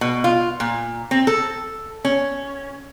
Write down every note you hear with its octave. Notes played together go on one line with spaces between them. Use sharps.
B2
F4
A#2
C4
A4
C#4